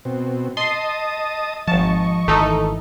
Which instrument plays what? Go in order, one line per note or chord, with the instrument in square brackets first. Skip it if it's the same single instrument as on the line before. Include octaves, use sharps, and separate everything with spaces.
[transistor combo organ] B2 C4
[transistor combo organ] D#5 A5 D#6 [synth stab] C6
[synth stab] G#1 A5 [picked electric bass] F3 [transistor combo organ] D#5 C#6
[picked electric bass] G#1 D#3 E3 [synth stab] A3 D#4 A4